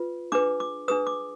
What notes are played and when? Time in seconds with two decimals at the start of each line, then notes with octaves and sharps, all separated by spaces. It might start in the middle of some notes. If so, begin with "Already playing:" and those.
Already playing: F4 B4
0.32 D4 G#4 B4 D6
0.60 D6
0.88 D4 G#4 B4 D#6
1.07 D6